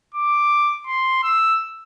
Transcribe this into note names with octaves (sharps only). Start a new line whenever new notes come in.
D6
C6
E6